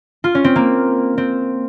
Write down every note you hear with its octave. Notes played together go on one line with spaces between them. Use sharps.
F4
C#4
C4
A#3
C4